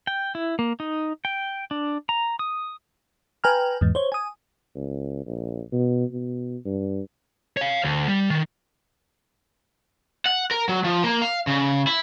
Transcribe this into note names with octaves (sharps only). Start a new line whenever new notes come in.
G5
E4
A#3
D#4
G5
D4
A#5
D#6
B4 G5 G#5 A#5 F6
E2 G#2
C5 C#5
G#5 D#6
C#2
A#1
B2
B2
G2
C#5 F5
D2
G3
D#3
F#5
A#4
F#3
F3
A#3
F5
C#3
E4